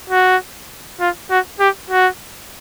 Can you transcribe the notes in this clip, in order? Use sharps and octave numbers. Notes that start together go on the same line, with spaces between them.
F#4
F4
F#4
G4
F#4